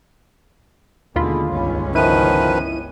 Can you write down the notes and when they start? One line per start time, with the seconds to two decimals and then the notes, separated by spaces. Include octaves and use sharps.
1.16 D#2 B2 D3 G#3 F4 B5
1.50 G1 C#2 C#4
1.95 D#3 F3 E4 B4 D#7